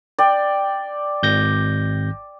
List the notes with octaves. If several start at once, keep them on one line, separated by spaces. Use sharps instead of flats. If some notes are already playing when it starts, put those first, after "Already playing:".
D5 G5
G#1 G6 A#6